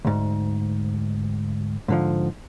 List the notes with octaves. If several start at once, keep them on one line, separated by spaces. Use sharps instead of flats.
D2 G#2
G#2 D3 F3